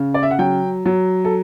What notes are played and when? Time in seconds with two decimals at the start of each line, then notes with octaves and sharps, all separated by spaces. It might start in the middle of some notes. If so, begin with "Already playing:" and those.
Already playing: C#3
0.14 D5
0.23 E5
0.31 F#5
0.39 F#3 G5
0.86 F#3
1.25 A4